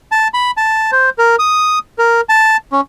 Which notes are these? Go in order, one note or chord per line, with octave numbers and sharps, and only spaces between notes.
A5
B5
A5
C5
A#4
D#6
A#4
A5
C#4